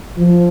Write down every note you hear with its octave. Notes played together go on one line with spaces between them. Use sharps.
F3